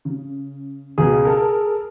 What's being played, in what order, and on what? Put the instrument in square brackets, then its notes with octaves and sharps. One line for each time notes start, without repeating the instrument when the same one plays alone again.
[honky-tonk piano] C#3
[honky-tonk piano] C#2 B2 [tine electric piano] G#4
[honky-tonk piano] A4 A#4